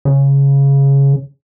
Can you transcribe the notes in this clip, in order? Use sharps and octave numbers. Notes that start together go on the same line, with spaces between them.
C#3